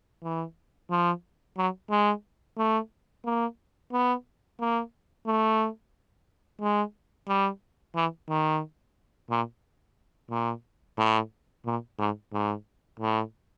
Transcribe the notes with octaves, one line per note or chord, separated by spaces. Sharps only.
E3
F3
F#3
G#3
A3
A#3
B3
A#3
A3
G#3
G3
E3
D#3
A#2
A#2
A2
A#2
G#2
G#2
A2